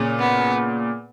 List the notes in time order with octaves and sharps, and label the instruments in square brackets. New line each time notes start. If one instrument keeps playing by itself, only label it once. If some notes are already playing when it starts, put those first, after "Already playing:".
Already playing: [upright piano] A#2 C#3 [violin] C#4
[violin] B3